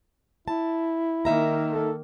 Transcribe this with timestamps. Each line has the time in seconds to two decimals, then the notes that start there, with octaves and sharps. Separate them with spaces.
0.48 E4 A5
1.25 D#3 A#3 D#4 E5 A#5
1.72 A4